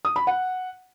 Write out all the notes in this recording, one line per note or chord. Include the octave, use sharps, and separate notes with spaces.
D#6
B5
F#5